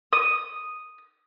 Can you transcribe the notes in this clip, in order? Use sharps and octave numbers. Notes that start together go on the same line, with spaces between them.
D#6